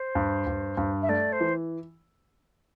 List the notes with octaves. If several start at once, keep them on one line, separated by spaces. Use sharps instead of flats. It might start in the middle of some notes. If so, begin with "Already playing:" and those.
Already playing: C5
G2
G2
G2
E5
A3 D5
C5
E3